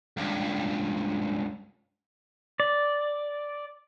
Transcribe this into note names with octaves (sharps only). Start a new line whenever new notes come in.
C#2 G2
D5